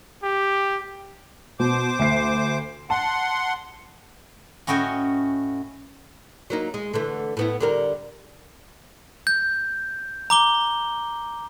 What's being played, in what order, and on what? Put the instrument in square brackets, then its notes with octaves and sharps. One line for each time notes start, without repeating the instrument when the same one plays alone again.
[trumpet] G4
[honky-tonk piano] B2 [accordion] C5 D6
[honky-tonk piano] D2 C7
[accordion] F#5 C6 [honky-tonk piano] A5
[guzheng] A2 C#4 F#4 D#5 G5 G#5
[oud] F#3 A#3 D#4
G#3
D3 E3 A3
A2 B3 E4
D3 G3 A#4
[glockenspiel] G6
A#5 D6 G7